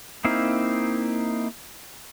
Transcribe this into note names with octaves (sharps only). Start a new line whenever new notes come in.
A#3 C4 D#4 E4 F5